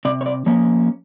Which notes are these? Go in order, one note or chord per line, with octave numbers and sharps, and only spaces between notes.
C3 D5
C#5
D5
F3 A#3 C#4 C#5